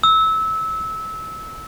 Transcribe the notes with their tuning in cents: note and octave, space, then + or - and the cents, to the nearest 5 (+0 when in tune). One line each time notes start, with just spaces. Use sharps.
E6 -20